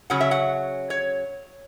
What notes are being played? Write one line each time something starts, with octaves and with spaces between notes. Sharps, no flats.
C#3 F#3 C#4 F#5
E5
F#5
C#5